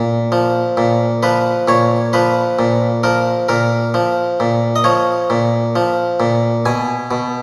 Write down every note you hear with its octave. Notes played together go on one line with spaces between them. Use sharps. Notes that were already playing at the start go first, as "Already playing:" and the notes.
Already playing: A#2
F3
A#2
F3 B4
A#2 C#5
F3 B4
A#2
F3 A#4
A#2 A#4
F3
A#2
D#5
F3 C#5
A#2
F3
A#2
B2 G#5
B2